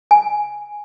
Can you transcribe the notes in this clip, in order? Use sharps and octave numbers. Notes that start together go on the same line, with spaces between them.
G#5